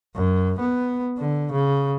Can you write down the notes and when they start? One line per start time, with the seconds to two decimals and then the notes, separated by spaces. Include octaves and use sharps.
0.16 F#2
0.60 B3
1.18 D3
1.52 C#3